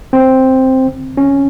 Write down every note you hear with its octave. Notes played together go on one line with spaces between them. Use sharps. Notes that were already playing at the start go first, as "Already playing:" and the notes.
C4
C#4